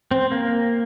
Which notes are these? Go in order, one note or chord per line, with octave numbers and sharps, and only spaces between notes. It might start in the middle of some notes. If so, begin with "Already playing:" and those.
C4
A#3